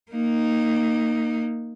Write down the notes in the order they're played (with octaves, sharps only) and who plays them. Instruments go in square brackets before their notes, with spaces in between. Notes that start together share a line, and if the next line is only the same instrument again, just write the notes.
[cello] A#3 D#4